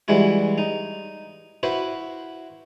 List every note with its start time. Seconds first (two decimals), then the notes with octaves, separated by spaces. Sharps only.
0.08 E3 G3 G#3 E4 F#4
0.58 D#4
1.63 E4 F#4 B4 C5